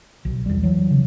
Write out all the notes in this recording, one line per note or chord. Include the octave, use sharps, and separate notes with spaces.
B1
E2 G3
E3 F#3
C#3